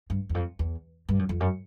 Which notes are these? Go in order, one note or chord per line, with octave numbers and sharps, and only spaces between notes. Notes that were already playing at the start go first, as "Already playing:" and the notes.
G2
E2
F2
E2
G2
F#2
F2
F#2